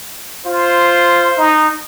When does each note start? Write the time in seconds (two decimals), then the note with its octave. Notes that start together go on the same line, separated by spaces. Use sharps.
0.46 F4 C5
1.38 D#4